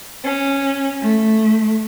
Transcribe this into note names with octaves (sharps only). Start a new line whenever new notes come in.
C#4
A3